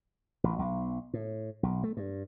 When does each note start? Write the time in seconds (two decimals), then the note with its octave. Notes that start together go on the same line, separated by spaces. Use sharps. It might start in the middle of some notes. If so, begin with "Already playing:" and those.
0.44 A1
0.59 B1
1.14 A2
1.63 B1
1.83 A3
1.97 G2